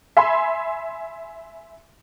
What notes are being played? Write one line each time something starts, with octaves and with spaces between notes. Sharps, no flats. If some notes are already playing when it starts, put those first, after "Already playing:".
E5 G#5 B5 C6